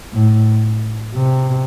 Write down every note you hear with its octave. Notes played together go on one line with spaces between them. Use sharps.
A2
C3